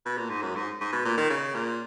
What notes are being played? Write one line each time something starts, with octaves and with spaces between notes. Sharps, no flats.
B2
A#2
G#2
F#2
G#2
G#2
B2
A#2
D#3
C#3
A#2